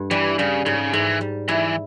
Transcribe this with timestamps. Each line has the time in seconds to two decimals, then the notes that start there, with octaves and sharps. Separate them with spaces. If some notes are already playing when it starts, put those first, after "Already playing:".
Already playing: G2
0.11 E3 G3
0.38 C#3 G3
0.65 G#2 C#3
0.93 G#2 E3
1.21 G3
1.48 E3 E4